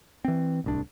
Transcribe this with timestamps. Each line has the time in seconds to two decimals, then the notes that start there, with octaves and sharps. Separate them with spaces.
0.25 E3 C4
0.64 D1 C2 D4